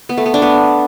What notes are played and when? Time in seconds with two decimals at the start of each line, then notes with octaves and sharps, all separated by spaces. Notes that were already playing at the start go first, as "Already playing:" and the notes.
0.09 B3
0.17 A3
0.26 B3
0.34 D4
0.42 B3